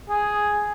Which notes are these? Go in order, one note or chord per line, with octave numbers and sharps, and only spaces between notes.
G#4